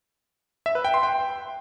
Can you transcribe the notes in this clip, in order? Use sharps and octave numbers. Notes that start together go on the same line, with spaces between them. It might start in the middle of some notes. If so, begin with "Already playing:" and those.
E5
B4
G5
C6
G5